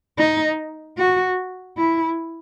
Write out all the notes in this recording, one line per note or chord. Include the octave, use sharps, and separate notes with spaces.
D#4
F#4
E4